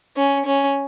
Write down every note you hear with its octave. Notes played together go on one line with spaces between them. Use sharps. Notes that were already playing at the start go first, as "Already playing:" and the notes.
C#4
C#4